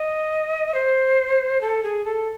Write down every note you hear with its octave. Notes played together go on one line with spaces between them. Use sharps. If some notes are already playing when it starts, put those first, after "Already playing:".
Already playing: D#5
C5
A4
G#4
A4